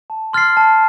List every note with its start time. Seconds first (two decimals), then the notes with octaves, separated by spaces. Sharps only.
0.10 A5
0.33 C6 F6 A6 C7
0.57 A5